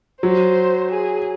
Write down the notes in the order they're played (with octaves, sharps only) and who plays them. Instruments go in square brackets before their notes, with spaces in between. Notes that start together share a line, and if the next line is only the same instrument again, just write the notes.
[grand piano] F#3 [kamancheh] C5
[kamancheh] G#4